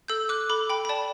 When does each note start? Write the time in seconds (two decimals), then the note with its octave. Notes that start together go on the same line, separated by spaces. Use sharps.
0.08 A4 E6 G6
0.29 D6 F#6
0.50 A4 B5 D6
0.70 G5 B5
0.85 B5
0.89 D5 A5